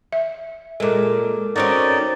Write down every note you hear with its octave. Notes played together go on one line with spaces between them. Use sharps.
E5
A#2 G#3 A4 A#4 D6
C4 C#4 D#4 F#4 D5